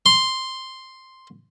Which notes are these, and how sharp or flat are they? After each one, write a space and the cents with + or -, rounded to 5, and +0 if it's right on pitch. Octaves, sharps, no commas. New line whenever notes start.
C6 +0